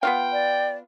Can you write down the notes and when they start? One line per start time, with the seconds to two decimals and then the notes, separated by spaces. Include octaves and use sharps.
0.03 B3 F4 F5 G5
0.32 D5